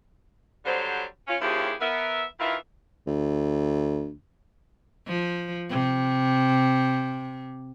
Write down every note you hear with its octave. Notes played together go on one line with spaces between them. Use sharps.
D3 F#3 G3 C5
C#4 F4
D#2 F3 C#4 E4 G4 G#4
B3 A#4 E5
D#3 E3 E4 F4 E5
D2
F3
C3